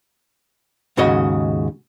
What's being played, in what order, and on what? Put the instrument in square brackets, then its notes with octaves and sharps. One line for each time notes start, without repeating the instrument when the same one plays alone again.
[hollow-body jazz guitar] D#2 G#2 C#3 F#4 D#5